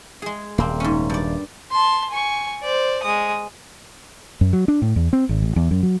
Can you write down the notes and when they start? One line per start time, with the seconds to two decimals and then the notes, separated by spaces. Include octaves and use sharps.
0.22 G#3 G#4
0.58 D#1 A#3 C4
0.80 G#2 C#4
1.10 G2 D5
1.71 A5 C6
2.10 G#5 C#6
2.63 C5 D5
3.03 G#3 D#6
4.41 F#2
4.53 F#3
4.68 D4
4.82 A2
4.96 E2
5.13 C4
5.29 G#1
5.42 A1
5.56 E2
5.71 F#2
5.83 F#3